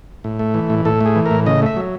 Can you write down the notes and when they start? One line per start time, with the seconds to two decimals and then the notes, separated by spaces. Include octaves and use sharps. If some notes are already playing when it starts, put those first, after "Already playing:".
0.24 A2
0.39 A3
0.54 E3
0.70 A2
0.85 A2 A4
1.01 A3
1.06 G#4
1.16 E3
1.26 A#4
1.31 A2
1.46 C#3 D#5
1.62 A3 E5
1.77 F#3